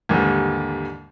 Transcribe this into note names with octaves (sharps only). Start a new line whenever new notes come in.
D#2 G#2 D3 E3 G3